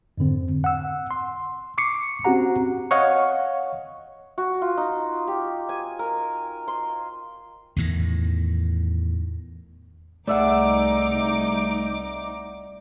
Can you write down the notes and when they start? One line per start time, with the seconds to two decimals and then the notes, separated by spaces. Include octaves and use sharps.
0.18 F2 G#2 D3 C4
0.64 F#5 E6
1.11 C6
1.78 C#6 D6 C7 C#7
2.25 C4 C#4 F#4 G4 F#5 A#5
2.91 C#5 D#5 F5 F#5 C#6
4.38 F#4
4.62 F4
4.77 D#4
5.27 G4
5.69 G#5
5.99 A#4
6.68 C6
7.76 E2 A2 D#3
10.27 C2 A3 D#4 G#4 D5 E5 F#5 D6